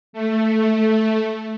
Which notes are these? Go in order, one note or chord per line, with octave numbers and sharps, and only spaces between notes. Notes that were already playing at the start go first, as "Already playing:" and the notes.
A3